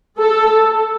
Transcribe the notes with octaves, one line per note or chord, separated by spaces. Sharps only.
A4